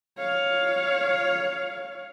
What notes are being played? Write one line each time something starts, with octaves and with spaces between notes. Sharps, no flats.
C#5 F5